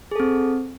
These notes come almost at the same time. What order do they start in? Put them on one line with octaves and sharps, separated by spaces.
G#4 A4 C4